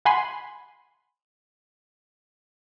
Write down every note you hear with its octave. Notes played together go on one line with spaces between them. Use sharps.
F#5 G#5 B5 C6